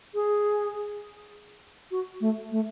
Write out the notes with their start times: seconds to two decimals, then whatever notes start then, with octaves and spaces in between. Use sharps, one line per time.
0.15 G#4
1.91 F#4
2.21 A3
2.51 A3